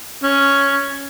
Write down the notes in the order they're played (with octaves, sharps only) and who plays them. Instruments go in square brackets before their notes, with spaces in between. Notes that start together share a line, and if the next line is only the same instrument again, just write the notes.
[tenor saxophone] C#4